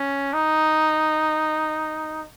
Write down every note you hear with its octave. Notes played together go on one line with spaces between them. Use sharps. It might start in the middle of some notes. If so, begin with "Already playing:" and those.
Already playing: C#4
D#4